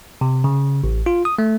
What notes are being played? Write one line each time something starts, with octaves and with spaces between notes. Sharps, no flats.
C3
C#3
A1
F4
D#6
A3